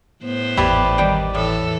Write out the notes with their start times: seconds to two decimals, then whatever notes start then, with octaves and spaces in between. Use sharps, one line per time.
0.24 A2 B3 C5
0.57 G#1 E2 E4 G4 B4 D5
0.98 D#3 G3 G5
1.35 A2 E3 A4